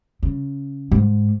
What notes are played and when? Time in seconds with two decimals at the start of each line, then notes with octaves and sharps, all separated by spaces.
0.23 C#3
0.91 G#2